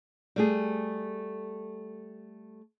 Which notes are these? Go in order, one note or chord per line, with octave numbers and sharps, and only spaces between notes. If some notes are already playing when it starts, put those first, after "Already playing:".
G3 A3 G#4